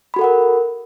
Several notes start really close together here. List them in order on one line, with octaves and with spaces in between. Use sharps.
B5 F#4 A4 F#5 A#4